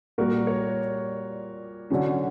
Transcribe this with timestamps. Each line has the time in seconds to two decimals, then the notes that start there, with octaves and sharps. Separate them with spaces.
0.18 A#2 G3 A#3 F#4 A#4
0.47 A#4 C#5
1.90 D3 F#3 C#4